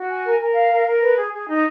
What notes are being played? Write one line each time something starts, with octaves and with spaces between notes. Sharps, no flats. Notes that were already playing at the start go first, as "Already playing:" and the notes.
Already playing: F#4
G#5
A#4
A#4
F5
A#4
A#4
B4
G#4
G#4
D#4